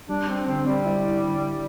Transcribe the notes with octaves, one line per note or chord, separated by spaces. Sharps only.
G3 D4
C4
D3 C4
G3
E4
D3